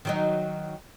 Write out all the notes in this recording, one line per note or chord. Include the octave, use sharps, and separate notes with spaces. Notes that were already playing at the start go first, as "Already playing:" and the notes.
D#3 F#3 D#4